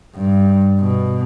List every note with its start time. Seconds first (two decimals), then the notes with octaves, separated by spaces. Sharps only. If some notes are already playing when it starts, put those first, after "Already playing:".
0.15 G2
0.80 B2